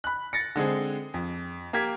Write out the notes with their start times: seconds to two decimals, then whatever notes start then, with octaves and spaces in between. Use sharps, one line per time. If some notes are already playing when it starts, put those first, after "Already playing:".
0.04 B5 F#6
0.33 A6 A#6 C#7
0.56 D3 G#3 C4 G#4
1.14 F2
1.73 A#3 G4 G#6 B6